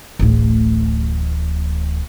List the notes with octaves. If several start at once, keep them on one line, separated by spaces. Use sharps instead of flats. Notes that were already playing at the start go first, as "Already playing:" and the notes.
D1 A1